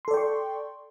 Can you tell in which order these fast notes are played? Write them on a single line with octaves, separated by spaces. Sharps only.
C6 A4 D5 G5 C#6